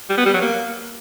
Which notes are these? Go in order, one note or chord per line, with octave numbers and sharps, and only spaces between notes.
G3
B3
G3
F#3
A#3